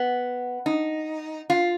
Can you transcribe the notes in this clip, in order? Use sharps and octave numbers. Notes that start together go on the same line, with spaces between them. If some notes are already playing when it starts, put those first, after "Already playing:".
Already playing: B3
D#4
F4